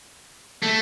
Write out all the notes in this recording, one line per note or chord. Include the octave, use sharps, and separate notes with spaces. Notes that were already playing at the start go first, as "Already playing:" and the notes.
A3